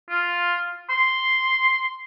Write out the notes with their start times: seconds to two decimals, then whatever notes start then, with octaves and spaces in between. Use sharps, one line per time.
0.10 F4
0.90 C6